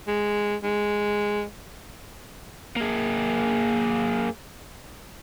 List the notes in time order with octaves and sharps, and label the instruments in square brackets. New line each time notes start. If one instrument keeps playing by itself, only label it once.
[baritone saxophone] G#3
G#3
[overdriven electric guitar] A#3 G#4